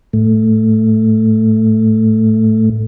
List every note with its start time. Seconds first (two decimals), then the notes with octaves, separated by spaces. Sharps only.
0.13 A2 A3